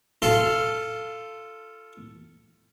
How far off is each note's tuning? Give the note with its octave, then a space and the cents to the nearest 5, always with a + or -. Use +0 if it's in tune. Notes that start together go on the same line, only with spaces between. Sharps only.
F4 -10 A4 +5 A5 +0